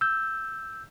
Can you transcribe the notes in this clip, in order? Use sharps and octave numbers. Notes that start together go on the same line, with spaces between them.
E6 G6